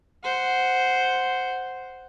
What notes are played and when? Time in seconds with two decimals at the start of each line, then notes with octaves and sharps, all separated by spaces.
0.24 C5 F#5